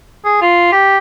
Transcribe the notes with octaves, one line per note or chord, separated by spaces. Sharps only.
G#4
F4
G4